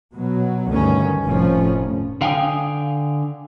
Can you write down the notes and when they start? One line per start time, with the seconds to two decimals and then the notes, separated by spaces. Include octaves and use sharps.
0.15 B2 F#3
0.70 D2 G2 D#3 C#4
1.24 F1 A2 D#3 F3 C#4
2.21 D3 F5 G5 G#5 D#6